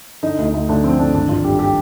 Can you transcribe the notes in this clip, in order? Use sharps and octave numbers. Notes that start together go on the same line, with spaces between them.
D3 D#4
D2
D#4
D2
D2 D4
F3 C4
D2 D4
G#1 D4
G#1 F4
G2 G4
G4